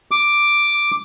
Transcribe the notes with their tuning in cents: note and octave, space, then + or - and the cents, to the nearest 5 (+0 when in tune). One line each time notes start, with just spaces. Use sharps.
D6 +5